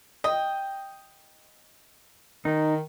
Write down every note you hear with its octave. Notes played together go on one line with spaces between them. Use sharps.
D#5 G5
D#3 D#4